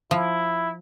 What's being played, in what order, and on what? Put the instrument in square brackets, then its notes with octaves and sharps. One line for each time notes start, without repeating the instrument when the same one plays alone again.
[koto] F3 [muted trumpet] E4